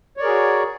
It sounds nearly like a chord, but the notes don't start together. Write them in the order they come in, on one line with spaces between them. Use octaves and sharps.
C#5 D5 A#4 G#4 F#4